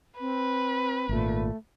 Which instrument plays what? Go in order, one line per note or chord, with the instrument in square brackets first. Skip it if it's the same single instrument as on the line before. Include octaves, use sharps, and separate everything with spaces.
[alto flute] C4 [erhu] B4
[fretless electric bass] G#1 A#2 [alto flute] A3